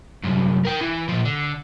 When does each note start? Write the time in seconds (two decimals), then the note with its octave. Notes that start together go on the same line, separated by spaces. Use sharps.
0.23 C2 F#2
0.65 A#4 G5
0.81 E3
1.08 A#2 F3
1.25 D3